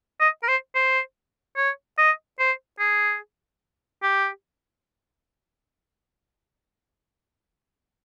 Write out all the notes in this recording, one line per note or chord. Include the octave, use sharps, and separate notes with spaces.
D#5
A#4
C5
C5
C#5
D#5
C5
G#4
G4